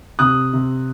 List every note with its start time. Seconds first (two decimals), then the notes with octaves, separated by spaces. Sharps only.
0.19 C3 D#6 F#6
0.53 C3